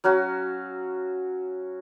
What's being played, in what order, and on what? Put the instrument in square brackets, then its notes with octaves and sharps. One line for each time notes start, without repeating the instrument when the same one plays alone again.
[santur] F#3 C#4 F#4 F5